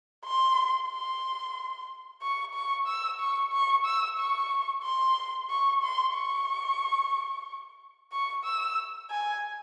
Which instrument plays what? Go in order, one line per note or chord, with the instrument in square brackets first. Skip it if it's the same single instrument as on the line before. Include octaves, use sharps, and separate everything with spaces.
[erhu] C6
C6
C#6
C#6
E6
C#6
C#6
E6
C#6
C6
C#6
C6
C#6
C#6
E6
G#5